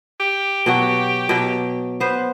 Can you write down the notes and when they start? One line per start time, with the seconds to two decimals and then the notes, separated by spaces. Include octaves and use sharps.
0.20 G4
0.66 B2 F#3 F#4
1.29 B2 F#3
2.00 B3 B4 C5